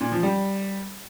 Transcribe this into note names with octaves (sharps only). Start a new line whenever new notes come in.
A#2
F3
G3